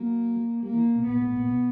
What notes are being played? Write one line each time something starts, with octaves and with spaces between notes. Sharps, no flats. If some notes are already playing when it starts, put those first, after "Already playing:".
Already playing: F#3 A#3
G3 A#3
E3
B2
A#2 B3
A2
A#2
B2